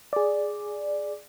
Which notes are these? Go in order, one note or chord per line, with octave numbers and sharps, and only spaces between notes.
G#4 D5